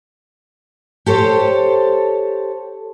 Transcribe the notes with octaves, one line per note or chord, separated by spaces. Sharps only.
G4 A4 C5 C#5